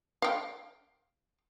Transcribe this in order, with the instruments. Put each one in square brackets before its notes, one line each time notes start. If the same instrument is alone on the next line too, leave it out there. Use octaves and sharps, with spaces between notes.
[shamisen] F5 G5